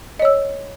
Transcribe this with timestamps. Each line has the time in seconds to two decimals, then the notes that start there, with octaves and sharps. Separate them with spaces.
0.19 D#5
0.22 C#5
0.25 E6